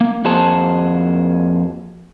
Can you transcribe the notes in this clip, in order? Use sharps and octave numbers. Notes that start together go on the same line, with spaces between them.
A#3
F2 A#3 F#4 G#4 C5 A5